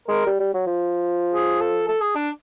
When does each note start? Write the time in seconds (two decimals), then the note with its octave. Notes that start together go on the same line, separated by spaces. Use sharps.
0.08 G#3 A#4
0.26 G3
0.40 G3
0.54 F#3
0.67 F3
1.34 G#4
1.61 A4
1.88 A4
2.01 G#4
2.15 D4